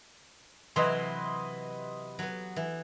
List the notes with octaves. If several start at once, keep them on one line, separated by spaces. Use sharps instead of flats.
C3 E3 F#3 B4 D#5 C6
F#3 B3
E3